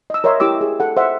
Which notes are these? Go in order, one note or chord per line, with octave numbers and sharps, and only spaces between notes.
D#5 E6
A#4 C#5 D#5 E5 C6
E4 G4 D6 E6
G#4
A4 F#5
C5 D#5 E5 F#5